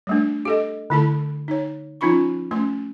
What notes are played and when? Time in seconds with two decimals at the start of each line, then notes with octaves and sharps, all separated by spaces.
0.07 G3 A3 D4
0.45 G4 A4 D#5
0.90 D3 A3 E4 A4 A5 B5
1.48 D#4 C#5
2.01 F3 C#4 D#4 F4 B5 C#6
2.51 A3 C#4 C6